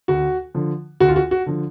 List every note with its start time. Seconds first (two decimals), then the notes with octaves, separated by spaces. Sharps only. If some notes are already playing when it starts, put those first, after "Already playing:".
0.08 D2 F#4
0.54 D3 F3
1.00 D2 F#4
1.09 F4
1.16 F#4
1.31 F#4
1.46 D3 F3